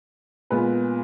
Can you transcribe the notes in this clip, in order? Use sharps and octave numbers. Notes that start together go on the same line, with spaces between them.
A#2 G#3 B3 B4